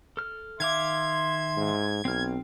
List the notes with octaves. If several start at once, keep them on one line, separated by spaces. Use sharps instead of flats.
A4 F6
D#3 E5 F5 C6 D6 G#6
G#2
B1 C4 F6